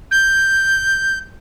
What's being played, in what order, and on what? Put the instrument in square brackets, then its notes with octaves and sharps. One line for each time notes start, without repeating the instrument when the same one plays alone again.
[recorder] G6